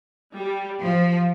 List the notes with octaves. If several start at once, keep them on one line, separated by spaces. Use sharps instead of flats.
G3
F3